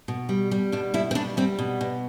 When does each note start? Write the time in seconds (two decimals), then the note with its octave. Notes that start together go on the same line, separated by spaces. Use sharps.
0.08 B2
0.29 G3
0.51 G3
0.72 B2 D4
0.94 B2 E4
1.11 C4
1.15 G3 D4
1.37 G3 C4
1.58 B2
1.81 B2